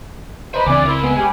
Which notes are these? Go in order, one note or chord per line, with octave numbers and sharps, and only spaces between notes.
B4 C5 D#5 E5 A#5 B5
C#2 D3 E3 C4 D5 E5 G#5 D6
E4 A#4 C6
G#3 B3
C#4 G4 B4 G#5